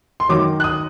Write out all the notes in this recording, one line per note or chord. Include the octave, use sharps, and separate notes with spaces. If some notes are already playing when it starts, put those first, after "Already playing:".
C6
F#2 D#3 F#3 D6
F#6
D#6